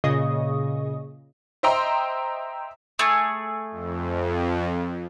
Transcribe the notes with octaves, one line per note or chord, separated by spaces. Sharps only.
A#2 C#3 G#4 D#5 C#6 D#6
C5 D#5 E5 G5 A#5 C6
A3 G#4
F2